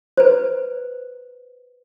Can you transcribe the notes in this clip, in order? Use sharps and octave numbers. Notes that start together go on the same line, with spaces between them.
B4 C5